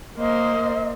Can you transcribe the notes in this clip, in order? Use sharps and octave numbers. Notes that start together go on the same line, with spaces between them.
A#3 C5 D#5